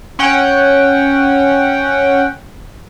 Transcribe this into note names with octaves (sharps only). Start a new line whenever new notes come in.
C#4 F#5 G5